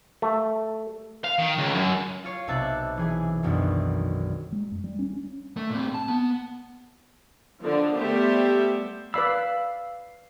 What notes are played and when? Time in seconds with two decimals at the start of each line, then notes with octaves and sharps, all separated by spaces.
0.22 A3
1.25 F5
1.39 D#3
1.58 C#2
1.75 F#2
2.24 F4 C#5 C7
2.47 B1 C3 E5 A5 F#6
2.97 E3 G#4 G#5
3.43 B1 F#2 B2 D3 D#3
4.52 G#3
4.72 F#2
4.84 G3
4.99 C#4
5.13 C#4
5.57 A3
5.70 A#2 C4
5.94 A5
6.08 B3
7.61 D3 F3
7.95 G3 A3 B3 G4 C5 E5
9.14 B4 D5 F5 B5 E6